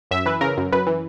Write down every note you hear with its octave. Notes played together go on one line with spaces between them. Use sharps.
F#2 E5
E3 B4
C#3 A#4
F#2
F#2 B4
E3